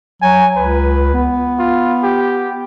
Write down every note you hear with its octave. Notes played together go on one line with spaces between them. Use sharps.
F#3 G#5
C#2 B4
B3
F4
G4